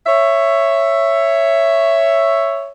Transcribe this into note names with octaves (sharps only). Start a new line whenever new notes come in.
C#5 E5